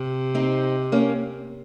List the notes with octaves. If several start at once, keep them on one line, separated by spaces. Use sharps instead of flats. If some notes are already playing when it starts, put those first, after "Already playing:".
Already playing: C3
C4 D#4
A#3 C#4